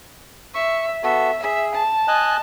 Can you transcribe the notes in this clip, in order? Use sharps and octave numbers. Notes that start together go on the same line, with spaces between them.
E5 C#6
B3 F#4 A4 E5
G#4 E5
A5
D#5 G#5 F#6